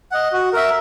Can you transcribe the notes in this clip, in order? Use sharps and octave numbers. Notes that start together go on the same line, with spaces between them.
D#5 F#5
F#4
A#4 E5